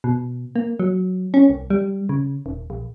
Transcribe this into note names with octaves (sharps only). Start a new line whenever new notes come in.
B2
A#3
F#3
C#4
C2
G3
C#3
D#1
A#1